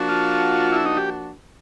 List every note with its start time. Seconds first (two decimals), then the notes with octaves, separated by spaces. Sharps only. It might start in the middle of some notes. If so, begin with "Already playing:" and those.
Already playing: F3 A#3 D4 F#4
0.09 F4
0.72 E4
0.85 D#4
0.97 G4